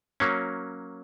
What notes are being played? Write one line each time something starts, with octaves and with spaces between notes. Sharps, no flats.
F#3 A#3 C#4